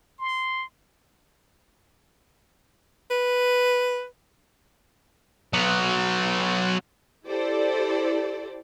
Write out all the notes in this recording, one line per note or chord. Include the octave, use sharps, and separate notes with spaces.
C6
B4
F#3 B3
E4 G4 A4 C5 D5